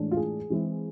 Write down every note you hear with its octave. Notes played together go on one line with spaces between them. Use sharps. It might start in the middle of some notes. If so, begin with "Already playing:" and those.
Already playing: A2 E3 G#3 D4
F4
G#4
E3 G#3 C4 E4